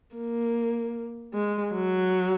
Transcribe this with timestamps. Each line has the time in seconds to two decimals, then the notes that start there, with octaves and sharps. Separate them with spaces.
0.16 A#3
1.34 G#3
1.73 F#3